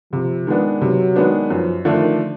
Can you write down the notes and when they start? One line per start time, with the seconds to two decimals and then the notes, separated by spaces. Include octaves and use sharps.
0.13 C3 F3
0.47 D#3 G#3 B3 D4
0.81 C3 F#3
1.16 D#3 G#3 B3 D4
1.50 F#2 F3
1.85 D3 D#3 F3 A3 D4